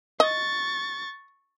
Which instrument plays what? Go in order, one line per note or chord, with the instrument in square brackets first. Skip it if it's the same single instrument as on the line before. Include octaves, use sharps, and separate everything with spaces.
[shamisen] D#5 [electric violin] C#6 A6